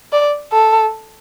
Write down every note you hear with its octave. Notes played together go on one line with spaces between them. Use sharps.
D5
A4